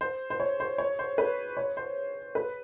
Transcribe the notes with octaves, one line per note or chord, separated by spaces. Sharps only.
C5
C5
C#5
C5
C#5
C5
B4
C#5
C5
B4